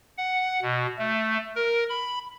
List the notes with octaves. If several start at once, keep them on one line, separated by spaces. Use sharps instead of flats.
F#5
B2
A3
A#4
B5